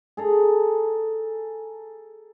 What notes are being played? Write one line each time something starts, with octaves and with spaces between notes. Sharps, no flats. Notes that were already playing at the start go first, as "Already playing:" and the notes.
G#4 A4 A#5